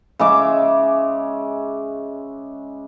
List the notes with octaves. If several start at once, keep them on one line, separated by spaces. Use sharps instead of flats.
C#3 G#3 E5 D6